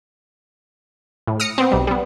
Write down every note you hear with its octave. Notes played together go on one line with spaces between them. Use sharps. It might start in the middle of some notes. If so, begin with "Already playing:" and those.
A2
D#6 F6 A#6 C#7
B3 C4
B1 G3
G3 B3